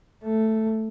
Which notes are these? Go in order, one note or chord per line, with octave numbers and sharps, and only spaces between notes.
A3